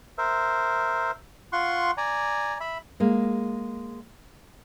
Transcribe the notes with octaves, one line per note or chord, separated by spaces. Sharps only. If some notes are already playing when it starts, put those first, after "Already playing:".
A#4 C5 E5
F4 F#5 C6 C#6
D5 G#5 A#5
E5 B5
G#3 A#3